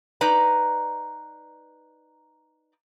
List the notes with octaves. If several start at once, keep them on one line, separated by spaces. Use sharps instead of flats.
D#4 B4 D5 A#5